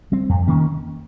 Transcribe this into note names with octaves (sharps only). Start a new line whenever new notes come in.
G3 C4
F2
D#3 A#3 C#4